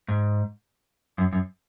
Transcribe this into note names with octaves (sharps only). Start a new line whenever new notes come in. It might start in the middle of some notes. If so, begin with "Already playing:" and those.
G#2
F#2
F#2